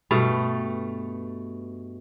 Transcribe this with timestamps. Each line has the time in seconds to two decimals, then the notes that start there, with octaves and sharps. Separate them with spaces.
0.11 G2 B2 A3